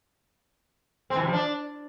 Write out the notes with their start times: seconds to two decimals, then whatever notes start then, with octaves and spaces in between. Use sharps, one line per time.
1.10 C4
1.16 E3
1.22 C3
1.27 F3
1.33 D4